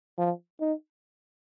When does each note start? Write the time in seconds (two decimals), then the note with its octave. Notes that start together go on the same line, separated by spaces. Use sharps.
0.18 F3
0.60 D#4